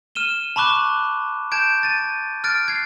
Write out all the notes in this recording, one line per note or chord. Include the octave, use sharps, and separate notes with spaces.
F6 D#7 E7 G7
A5 B5 C#6 D6 F#6
A5 G6 G#6 D7
A6 D#7
F6 F#6 A6 D7
G#6 C7